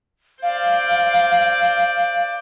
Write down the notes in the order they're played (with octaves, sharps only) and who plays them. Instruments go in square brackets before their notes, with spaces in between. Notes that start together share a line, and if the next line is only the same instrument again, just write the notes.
[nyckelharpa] C5 D5 [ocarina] F5